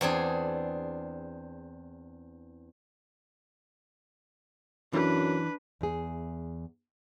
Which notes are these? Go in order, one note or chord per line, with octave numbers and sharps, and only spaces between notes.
E2 C4 D4 G#4
F#2 E3 D4 B4
E2 G#4